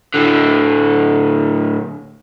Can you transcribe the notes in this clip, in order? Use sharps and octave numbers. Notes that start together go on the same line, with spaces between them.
A2 D3